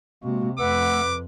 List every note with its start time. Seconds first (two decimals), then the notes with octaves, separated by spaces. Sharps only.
0.24 C3 G#3 A#3 F#4
0.59 F2 A3 B4 F#5 D6 E6